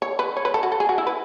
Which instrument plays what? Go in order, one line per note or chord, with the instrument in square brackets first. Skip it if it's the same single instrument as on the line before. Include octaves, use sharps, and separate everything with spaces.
[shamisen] C#5
B4
C#5
B4
A4
F#4
A4
G#4
F#4
E4
B4